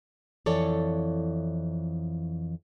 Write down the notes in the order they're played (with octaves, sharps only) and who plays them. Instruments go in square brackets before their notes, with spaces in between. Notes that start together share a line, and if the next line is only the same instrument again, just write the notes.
[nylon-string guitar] F2 E3 A4 C#5 D5